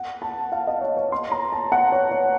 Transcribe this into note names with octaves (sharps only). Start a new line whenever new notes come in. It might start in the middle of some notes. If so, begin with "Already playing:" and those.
Already playing: F#5
A5
F5
D#5
C#5
C#5
C6
A#5
A5
F#5
C#5
C#5